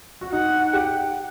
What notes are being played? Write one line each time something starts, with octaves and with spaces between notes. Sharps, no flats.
F#4
D#4 F#5
G4